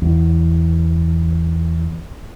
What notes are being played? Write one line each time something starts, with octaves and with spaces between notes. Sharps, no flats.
E2 E3